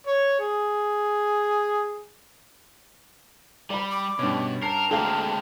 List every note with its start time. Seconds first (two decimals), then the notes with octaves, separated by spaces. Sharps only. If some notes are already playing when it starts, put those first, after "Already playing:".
0.07 C#5
0.40 G#4
3.70 G3 D5 B5
3.91 D6
4.19 G2 B2 C#4
4.62 A#4 A5 C7
4.91 D2 G#3 A#3 C4 A4 F5 A#5